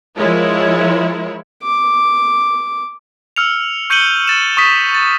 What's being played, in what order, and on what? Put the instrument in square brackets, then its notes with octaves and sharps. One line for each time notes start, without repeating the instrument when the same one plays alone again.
[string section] F3 G#3 E4 F4 A#4 C#5
[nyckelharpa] D6
[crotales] E6 F6 C#7 F7
C#6 G6 C#7 D#7 F#7 G7
A6 E7
C#6 D#6 B6
A6